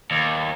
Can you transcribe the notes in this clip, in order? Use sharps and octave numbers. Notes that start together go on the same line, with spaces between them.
D#2